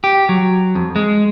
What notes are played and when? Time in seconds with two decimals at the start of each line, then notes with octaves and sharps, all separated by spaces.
0.04 G4
0.29 F#3
0.75 F2
0.96 G#3